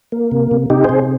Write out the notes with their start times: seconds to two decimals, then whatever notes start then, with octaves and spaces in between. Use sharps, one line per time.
0.12 A#3
0.31 C3
0.51 C3
0.70 C3 D#4 G4
0.84 C3 G#4 C5